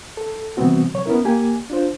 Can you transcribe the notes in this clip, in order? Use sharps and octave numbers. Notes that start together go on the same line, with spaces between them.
A4
C3 E3 G3 B3 C4 F#4
C3 F#3 C#5
B3 C#4 E4 A#4
A#3 G4 G#5
D4 F4 C5